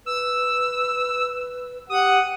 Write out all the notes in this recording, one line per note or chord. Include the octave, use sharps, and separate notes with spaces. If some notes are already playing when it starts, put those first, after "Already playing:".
B4 E6
G4 F#5 D#6